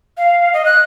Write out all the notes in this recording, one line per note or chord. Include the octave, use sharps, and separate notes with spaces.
F5
D#5
F#6